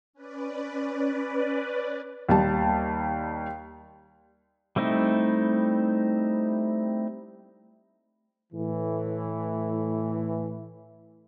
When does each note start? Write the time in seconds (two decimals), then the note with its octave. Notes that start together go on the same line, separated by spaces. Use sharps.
0.13 C#4 B4 D5
2.29 D#2 G3 A5
4.76 G3 A3 C4 D#4 E4
8.53 A2 E3